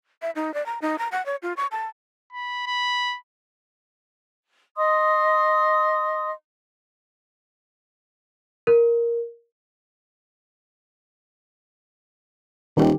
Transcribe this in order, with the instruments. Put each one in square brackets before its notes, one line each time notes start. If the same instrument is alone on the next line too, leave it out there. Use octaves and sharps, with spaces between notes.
[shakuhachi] E5
D#4
D5
A#5
D#4
A#5
F#5
C#5
F4
C#6
A5
[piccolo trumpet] B5
B5
[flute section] D#5 C6 D#6
[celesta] A#4
[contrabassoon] D#1 [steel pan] D#3 G4